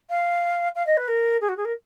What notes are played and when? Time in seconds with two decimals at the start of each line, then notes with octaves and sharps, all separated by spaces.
0.10 F5
0.75 F5
0.86 D#5
0.97 B4
1.08 A#4
1.41 G#4
1.49 F#4
1.57 G#4
1.65 A#4